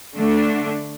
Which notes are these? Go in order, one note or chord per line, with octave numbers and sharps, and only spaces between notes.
D3 A3 D4